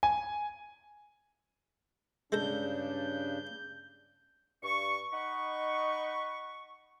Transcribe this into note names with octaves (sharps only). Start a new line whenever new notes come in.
G#5
G2 C#3 G#3 D4 A4 A#5 G6
G2 C#6
D#4 D#5 F#5 B5 C#6